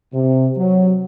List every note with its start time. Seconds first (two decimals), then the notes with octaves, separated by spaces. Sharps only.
0.13 C3
0.57 F#3